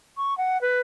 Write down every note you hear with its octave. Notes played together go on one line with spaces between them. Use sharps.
C#6
F#5
B4